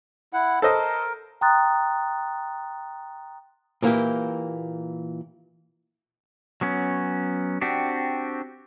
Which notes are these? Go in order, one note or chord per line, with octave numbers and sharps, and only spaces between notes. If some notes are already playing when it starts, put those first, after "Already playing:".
E4 F#5
A4 A#4 C5 D#5
G5 A#5 C6 D#6 F#6 A6
A#2 E3 A#3 E4 G4
F#3 B3 C#4
C4 D4 F#4 G4